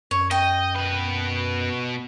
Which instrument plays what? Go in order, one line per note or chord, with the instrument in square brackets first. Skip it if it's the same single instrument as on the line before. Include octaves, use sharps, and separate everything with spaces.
[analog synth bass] F#2 [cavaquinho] C#5
[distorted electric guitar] D#5 [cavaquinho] G5
[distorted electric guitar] B2 B4